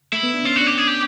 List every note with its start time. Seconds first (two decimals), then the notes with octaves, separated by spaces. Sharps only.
0.13 A3 E4
0.23 B3
0.34 D4
0.45 C#4 F4
0.56 D4 F#4
0.66 G4
0.78 G#4
0.87 G4